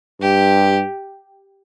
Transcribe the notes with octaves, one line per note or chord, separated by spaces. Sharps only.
G2 G4